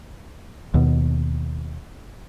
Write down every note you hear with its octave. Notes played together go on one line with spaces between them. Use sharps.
D#2 B2